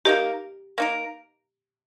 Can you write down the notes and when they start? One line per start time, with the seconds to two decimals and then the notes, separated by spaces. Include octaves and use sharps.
0.05 A#3 D#4 G4 A#4
0.78 A#3 D#4 A#4